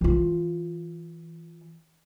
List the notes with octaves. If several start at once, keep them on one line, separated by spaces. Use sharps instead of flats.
E3 F4